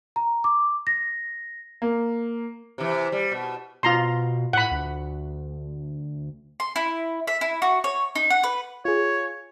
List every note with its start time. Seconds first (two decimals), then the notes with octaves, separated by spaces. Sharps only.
0.16 A#5
0.44 D6
0.87 A#6
1.82 A#3
2.78 C3 E3
3.12 G3
3.32 B2
3.83 B2 F4 A#5 C6
4.53 A2 F#5 B5
4.71 D2
6.60 C6
6.76 E4
7.27 E5
7.41 E4
7.62 F#4
7.84 C#5
8.15 D#4
8.30 F#5
8.44 B4
8.85 F4 G#4 C#5